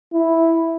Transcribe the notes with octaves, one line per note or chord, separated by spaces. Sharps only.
E4